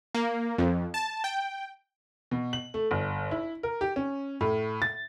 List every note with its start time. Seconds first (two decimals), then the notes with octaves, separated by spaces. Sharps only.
0.15 A#3
0.58 F2
0.94 A5
1.24 G5
2.31 B2
2.53 F#7
2.74 A3
2.91 G1
3.31 E4
3.63 A#4
3.81 G4
3.96 C#4
4.41 A2
4.82 A6